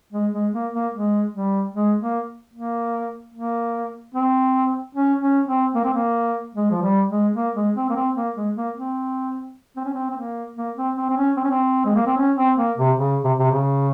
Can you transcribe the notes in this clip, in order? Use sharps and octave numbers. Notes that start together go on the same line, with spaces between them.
G#3
G#3
A#3
A#3
G#3
G3
G#3
A#3
A#3
A#3
C4
C#4
C#4
C4
A#3
C4
A#3
G#3
F3
G3
G#3
A#3
G#3
C4
A#3
C4
A#3
G#3
A#3
C4
C4
C#4
C4
C4
A#3
A#3
C4
C4
C4
C#4
C4
C#4
C4
G#3
A#3
C4
C#4
C4
A#3
C3
C#3
C3
C3
C#3